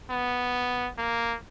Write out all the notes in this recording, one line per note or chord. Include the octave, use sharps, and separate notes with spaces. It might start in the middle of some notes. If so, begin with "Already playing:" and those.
B3
A#3